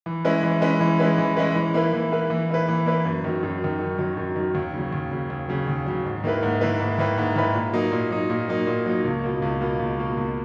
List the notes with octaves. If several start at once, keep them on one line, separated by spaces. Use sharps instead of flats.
E3
G#3 C#4 E4 B4
E3
G#3 C#4 E4 B4
E3
G#3 C#4 E4 B4
E3
G#3 C#4 E4 B4
E3
A#3 E4 B4
E3
A#3 E4 B4
E3
A#3 E4 B4
E3
A#3 E4 B4
F#2
D#3 F#3
F#2
D#3 F#3
F#2
D#3 F#3
F#2
D#3 F#3
D#2
C#3 F#3
D#2
C#3 F#3
D#2
C#3 F#3
D#2
C#3 F#3
G#2
D#3 A#3 E4 B4
G#2
D#3 A#3 E4 B4
G#2
D#3 A#3 E4 B4
G#2
D#3 A#3 E4 B4
A#2
F#3 A#3 D#4
A#2
F#3 A#3 D#4
A#2
F#3 A#3 D#4
A#2
F#3 A#3 D#4
C#2
B2 A#3
C#2
B2 A#3
C#2
B2 A#3
C#2